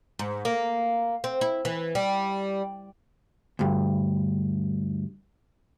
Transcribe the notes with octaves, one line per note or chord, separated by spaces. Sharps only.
G#2
A#3
C4
E4
E3
G3
D2 G2